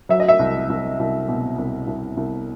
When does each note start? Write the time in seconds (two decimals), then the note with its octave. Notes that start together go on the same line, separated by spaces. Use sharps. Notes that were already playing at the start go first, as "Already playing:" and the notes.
0.09 F#3 E5
0.20 D#5
0.28 E5
0.39 C2
0.69 C2
0.99 C2
1.28 B2
1.58 C2
1.87 C2
2.17 C2